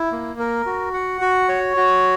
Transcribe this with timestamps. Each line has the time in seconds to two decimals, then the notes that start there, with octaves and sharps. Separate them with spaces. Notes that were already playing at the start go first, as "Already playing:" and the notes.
Already playing: E4
0.12 A#3
0.39 A#4
0.66 F#4
0.94 F#5
1.21 F#4
1.49 C#5
1.77 F#4